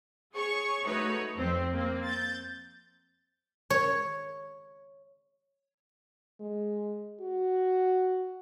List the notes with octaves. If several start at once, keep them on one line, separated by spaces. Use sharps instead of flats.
G#4 C#5 C#6
A3 D#4 F#4 B4 C#5
F2 C4
A#3 C4
G6 A6
C#5
G#3
F#4